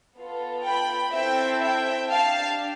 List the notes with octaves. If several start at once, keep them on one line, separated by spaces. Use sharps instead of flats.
B3 F4 A4
G5 B5
C4 E4 A4 E5 G5
E5 G5
D4 G4 F5 A5